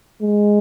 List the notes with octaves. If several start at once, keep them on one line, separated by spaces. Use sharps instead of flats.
G#3